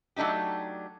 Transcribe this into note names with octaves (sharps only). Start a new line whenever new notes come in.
F#3 A3 D4 D#4 G4